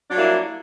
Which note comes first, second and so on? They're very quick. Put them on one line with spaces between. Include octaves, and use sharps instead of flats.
D4 F#3 G3 A#3 E4